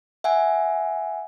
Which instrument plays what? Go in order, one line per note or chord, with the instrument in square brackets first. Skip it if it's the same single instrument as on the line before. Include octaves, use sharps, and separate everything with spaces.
[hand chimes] E5 F#5 G#5